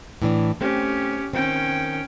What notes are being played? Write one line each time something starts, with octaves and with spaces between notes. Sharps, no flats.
A2 E3 D4
A3 C4 C#4 G4
D#3 C4 C#4 G5